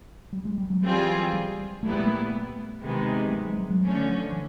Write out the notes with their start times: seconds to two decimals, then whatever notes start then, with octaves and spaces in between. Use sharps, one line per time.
0.32 G3
0.45 G#3
0.58 G3
0.70 F#3
0.83 E3 G3 C4 F4 G#4
1.33 G3
1.83 A#2 G3 A3 B3 E4
1.93 G#3
2.04 A3
2.82 C3 D#3 G#3 B3
3.28 G3
3.33 G#3
3.45 G#3
3.58 G3
3.70 F#3
3.83 D3 F3 A3 C#4
4.32 E3